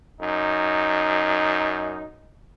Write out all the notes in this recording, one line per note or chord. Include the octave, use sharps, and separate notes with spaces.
F#2 D#4